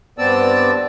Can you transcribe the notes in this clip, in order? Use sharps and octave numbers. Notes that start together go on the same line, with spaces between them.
G2 B3 C4 D5 A5 E6